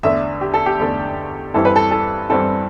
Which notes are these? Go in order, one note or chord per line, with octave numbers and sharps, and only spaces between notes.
E2 D3 A3 D4 E5
G4
A4
G4
E2 D3 A3 D4
G2 E3 G3 C4 E4 A4
B4
A4
A4
G2 E3 G3 C4 E4 A4